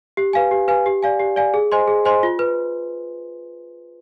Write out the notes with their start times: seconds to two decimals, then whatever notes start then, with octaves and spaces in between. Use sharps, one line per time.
0.17 G4
0.33 B4 F5 G#5
0.51 G4
0.68 B4 F5 G#5
0.86 G4
1.03 D5 F5 G#5
1.19 G4
1.36 D5 F5 G#5
1.54 G#4
1.72 C5 D#5 G#5 C6
1.88 G#4
2.05 C5 D#5 G#5 C6
2.23 F4
2.39 B4